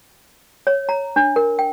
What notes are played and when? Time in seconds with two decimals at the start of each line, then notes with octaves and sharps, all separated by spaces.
0.67 C#5
0.89 A#5
1.16 D4
1.36 A#4
1.59 G5